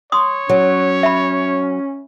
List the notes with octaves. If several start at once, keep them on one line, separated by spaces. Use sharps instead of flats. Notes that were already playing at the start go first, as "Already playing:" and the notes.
C#5 C6 D#6
F#3 C#4
E5 B5